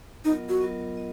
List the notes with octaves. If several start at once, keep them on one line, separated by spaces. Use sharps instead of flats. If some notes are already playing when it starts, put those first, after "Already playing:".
F#3 B3 D#4 F4 A#4 D#5
F#4
F#3 B3 F4 A#4 D#5
D#5